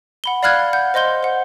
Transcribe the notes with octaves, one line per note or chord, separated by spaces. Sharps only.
F#5 B5 G7
D5 F5 B5 F6 F#6 G#6
F#5 G6
C5 D#5 C6 G6 G7
C5 F#5